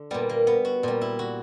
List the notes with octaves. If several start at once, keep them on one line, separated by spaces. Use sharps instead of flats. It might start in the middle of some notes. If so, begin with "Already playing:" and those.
Already playing: D3
A#2 G3 B3
A#3
B3
F#4
A#2 G3
E4
F#4